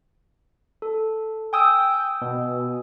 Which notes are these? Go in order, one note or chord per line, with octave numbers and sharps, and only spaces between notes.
A4
G5 G#5 D#6 E6
B2